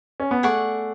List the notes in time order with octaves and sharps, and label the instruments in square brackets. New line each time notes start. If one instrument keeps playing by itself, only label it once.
[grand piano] C#4
B3
[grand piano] A3 [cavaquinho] G#4 D5 F#5 C#6